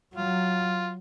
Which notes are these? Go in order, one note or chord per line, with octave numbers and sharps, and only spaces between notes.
F#3 F4